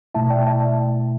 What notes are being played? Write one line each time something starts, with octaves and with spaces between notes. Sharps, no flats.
B2 A3 E4 E5 A5
D5 G5
E5 A5